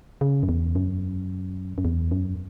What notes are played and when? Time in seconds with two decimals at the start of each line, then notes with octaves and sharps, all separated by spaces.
0.21 C#3
0.43 F#2
0.49 E2
0.75 F#2
1.78 F#2
1.85 E2
2.11 F#2